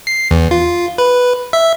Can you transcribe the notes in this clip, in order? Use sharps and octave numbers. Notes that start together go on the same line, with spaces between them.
C7
E2
F4
B4
E5